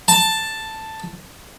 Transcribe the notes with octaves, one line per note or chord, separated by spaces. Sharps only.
A5